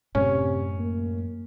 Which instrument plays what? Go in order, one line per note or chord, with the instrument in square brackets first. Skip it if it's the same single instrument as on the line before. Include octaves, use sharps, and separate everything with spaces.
[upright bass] F#2 A2 [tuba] C3 [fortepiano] C#4
[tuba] A#3